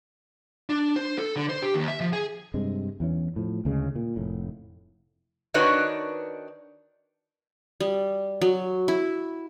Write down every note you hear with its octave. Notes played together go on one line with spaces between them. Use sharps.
D4
C5
A4
D3
C5
G4
D#2
E5
F3
G#4
G2 C3 G#3
E2 E3 C#4
A2 F3
D2 C#3 G#3
A#2
F1 A2
D#3 D4 D#4 F#4 B4 C#5
G3
F#3
E4